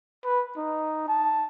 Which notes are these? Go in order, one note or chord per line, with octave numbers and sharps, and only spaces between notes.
B4
D#4
A5